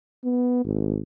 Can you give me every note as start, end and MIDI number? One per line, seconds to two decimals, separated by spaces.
0.24 0.61 59
0.65 1.01 32